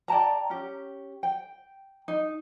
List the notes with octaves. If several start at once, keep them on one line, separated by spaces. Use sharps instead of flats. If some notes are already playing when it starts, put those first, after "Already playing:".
D5 G5 A5 A#5
C#4 G4
G5
D#4